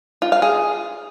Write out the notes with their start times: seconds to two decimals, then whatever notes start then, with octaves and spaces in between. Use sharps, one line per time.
0.22 F4
0.32 F5
0.42 G#4